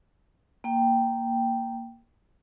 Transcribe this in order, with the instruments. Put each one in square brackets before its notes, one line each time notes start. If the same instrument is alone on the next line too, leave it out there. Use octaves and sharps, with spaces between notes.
[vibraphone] A#3 G5